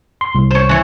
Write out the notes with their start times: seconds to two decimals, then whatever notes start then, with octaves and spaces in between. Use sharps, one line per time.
0.21 C6
0.35 C2
0.51 C5 C#5
0.69 E3 C#5